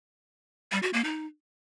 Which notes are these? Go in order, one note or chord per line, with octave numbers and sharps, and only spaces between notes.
G3
F#4
A#3
D#4